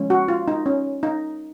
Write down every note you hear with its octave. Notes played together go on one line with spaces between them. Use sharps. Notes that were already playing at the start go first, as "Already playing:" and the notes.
Already playing: F3 G#3 C#4
F#4
F4
D#4
C#4
D#4